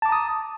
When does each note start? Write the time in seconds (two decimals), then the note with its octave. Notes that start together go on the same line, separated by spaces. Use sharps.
0.02 A5
0.06 D6
0.09 A#5
0.12 D#6